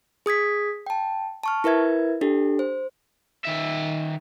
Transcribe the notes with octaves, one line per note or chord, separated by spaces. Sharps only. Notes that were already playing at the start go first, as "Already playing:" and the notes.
G#4 D#6 G#6 B6
G5 A5
A5 C#6 F6
E4 A#4 B4 E5 G#6
D4 G4 A4
C5
D#3 E5